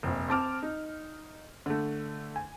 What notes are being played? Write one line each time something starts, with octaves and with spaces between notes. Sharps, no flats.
F1 A#1
C4 A5 D6 F6
D#4
D3 A3
G#5